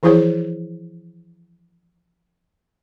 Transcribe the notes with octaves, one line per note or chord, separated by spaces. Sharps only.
E3 F3 E4 G#4 C5 C#5